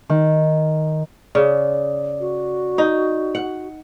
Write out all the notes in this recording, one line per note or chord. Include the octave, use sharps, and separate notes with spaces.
D#3
C#3 D5
F#4
D#4
F#5